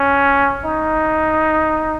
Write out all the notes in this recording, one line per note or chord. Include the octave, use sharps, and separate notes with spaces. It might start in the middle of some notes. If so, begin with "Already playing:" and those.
Already playing: C#4
D#4